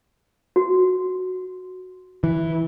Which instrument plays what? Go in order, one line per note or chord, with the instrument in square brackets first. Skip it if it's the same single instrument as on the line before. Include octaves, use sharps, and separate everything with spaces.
[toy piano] F#4
[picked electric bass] E3